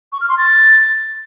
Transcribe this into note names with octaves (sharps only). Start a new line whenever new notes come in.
C#6
F6
C6
A6